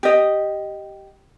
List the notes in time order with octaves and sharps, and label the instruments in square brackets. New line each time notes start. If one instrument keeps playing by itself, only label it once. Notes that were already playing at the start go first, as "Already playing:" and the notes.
[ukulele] G4 D#5